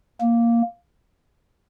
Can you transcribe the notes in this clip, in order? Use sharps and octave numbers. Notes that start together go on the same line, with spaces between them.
A#3